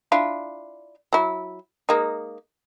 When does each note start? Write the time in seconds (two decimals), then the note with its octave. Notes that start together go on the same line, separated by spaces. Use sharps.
0.12 D4 E4 F4
1.13 F#3 E4
1.89 G#3 A#3 D#4